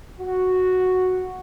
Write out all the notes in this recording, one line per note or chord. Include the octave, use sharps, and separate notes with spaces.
F#4